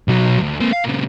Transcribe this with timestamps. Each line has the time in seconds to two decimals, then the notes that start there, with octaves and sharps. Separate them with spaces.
0.08 B1 F#3
0.40 D2
0.61 A#3 C4
0.73 F5
0.84 A#2 C#3